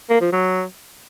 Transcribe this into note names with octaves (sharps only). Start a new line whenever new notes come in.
A#3
F3
F#3